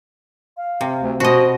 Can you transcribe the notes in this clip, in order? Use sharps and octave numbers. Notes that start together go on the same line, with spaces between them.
F5
C3
D2
B2 F#4 C5 D#5